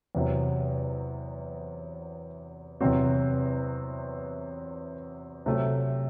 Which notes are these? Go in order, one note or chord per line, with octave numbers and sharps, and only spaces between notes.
E2 C3 F#3
E2 C3 F#3 C4 F#4
C3 F#3 A3